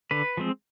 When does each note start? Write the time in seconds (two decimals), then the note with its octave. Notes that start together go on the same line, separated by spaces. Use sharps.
0.11 D3 B4
0.37 F3 G#3 C4